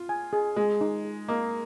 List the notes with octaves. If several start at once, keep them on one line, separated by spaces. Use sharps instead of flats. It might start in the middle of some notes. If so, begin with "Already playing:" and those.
Already playing: F4
G#5
G#4
G#3 G#4
D#4
G#4
A#3 D#5